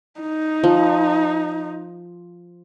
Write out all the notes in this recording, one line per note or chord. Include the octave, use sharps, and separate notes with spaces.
D#4
F3